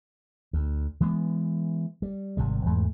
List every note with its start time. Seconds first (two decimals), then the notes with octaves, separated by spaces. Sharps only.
0.53 D2
1.01 E3 G#3 B3
2.02 G3
2.37 G#1 C3 G3
2.65 E2 G#2 E3 A3